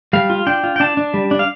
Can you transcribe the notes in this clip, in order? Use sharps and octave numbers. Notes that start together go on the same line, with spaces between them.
G3 F5
F4
D4 G5
F4
G5
D4 A5
D4
G3
D4
F5